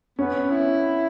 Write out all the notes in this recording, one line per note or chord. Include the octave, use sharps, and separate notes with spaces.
B3 C#4
E4